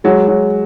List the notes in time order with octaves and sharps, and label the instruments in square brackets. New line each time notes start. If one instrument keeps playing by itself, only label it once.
[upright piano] F#3 [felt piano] G#3
[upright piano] F#3